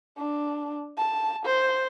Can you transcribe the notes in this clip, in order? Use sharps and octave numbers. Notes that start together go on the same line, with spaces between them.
D4
A5
C5